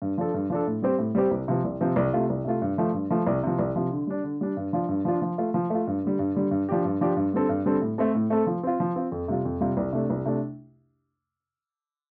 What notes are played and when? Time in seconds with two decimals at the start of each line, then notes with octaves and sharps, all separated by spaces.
0.02 G2
0.18 F3 D4 A4
0.34 G2
0.50 F3 D4 A4
0.67 A2
0.82 G3 C4 G4 C5
0.99 A2
1.15 G3 C4 G4 C5
1.31 C2
1.48 C3 F3 C4
1.64 C2
1.81 C3 F3 C4
1.96 C2
2.13 C3 A3 F4
2.30 C2
2.45 C3 A3 F4
2.62 G2
2.78 F3 A3
2.94 G2
3.10 F3 A3
3.27 C2
3.43 C3 F3
3.59 C2
3.76 C3 F3
3.91 D3
4.07 G3 D4
4.24 D3
4.41 G3 D4
4.57 G2
4.73 F3 D4 F4
4.89 G2
5.05 F3 D4 F4
5.22 F3
5.38 A3 F4
5.54 F3
5.70 A3 F4
5.87 G2
6.04 D3 G3
6.19 G2
6.35 D3 G3
6.51 G2
6.69 F3 D4 G4
6.85 G2
7.01 F3 D4 G4
7.16 G2
7.33 D3 G3 C4 A4
7.49 G2
7.65 D3 G3 C4 A4
7.82 A2
7.98 A3 C4 A4
8.15 A2
8.30 A3 C4 A4
8.47 F3
8.63 C4 F4
8.80 F3
8.96 C4 F4
9.12 F2
9.28 C3 G3 F4
9.45 F2
9.61 C3 G3 F4
9.77 C2
9.93 C3 A3 D4
10.10 C2
10.25 C3 A3 D4